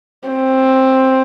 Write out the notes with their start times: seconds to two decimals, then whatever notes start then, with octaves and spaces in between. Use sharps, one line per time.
0.29 C4